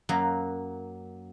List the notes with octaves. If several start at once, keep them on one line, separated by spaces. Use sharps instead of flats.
F#2 F#3 A#3